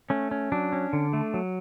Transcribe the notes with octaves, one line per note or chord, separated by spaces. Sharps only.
A3 C#4
C#4
F#3 D4
C#4
D3
A3
F#3